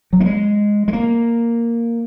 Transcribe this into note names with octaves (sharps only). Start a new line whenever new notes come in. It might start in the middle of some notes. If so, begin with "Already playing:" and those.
F#3
A#3
G#3
G#3
A#3